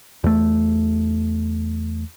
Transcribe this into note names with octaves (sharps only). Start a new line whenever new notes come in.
E2 A3